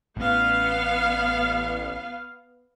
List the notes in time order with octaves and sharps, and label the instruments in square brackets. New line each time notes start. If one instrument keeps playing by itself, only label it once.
[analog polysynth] A1 [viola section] B3 F5